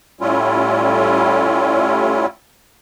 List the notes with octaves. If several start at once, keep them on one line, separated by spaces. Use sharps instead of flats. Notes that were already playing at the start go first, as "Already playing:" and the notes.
A2 G3 C#4 E4 F4